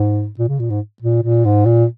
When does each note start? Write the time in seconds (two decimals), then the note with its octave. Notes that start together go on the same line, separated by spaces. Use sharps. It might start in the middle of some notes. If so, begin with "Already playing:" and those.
Already playing: G#2
0.39 A#2
0.49 C#3
0.59 A#2
0.70 G#2
1.03 A#2
1.23 A#2
1.45 G#2
1.66 A#2